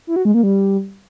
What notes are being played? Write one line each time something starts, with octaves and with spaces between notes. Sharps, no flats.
E4
F#4
G#3
A#3
G3